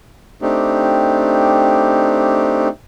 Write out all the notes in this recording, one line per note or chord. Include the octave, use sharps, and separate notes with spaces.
A3 C4 D4 D#4 G4